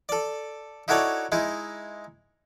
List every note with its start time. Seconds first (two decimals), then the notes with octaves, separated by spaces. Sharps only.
0.09 A4 D5
0.88 D#4 E4 F#4 A4 C#5 D5
1.32 G#3 D#4 E4